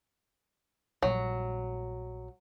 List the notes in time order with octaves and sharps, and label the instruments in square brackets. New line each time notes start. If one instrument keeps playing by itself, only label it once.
[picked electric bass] A#1 A#2 G3 [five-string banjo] F#3